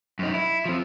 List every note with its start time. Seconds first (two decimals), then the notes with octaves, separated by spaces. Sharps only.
0.19 F#2 D#4
0.34 E4
0.66 F3 C4